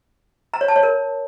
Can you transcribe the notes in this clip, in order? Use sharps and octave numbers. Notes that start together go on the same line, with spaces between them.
A#5
C#5
A5
C#5
A#4